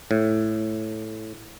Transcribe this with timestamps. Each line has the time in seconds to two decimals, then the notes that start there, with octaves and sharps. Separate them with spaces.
0.11 A2